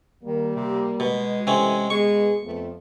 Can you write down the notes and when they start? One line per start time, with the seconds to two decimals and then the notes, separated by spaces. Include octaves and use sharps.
0.23 D#3 G3 A#3
0.56 C3
1.00 B2 G#3
1.47 C3 E3 A3 C4 C#4
1.90 B2 G#3 B3 G#4 C#6
2.43 F2 F3 A3 B3